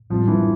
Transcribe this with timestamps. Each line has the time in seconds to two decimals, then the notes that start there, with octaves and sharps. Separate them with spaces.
0.10 A1 A2 F3 G3 C4
0.28 E3